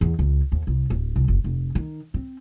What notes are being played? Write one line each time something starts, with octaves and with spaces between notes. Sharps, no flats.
E2
C#2
D#2
C2
D1
C2
F#1
F1
D#3
C4